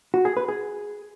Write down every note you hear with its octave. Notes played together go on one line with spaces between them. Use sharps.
F#4
G#4
B4
G#4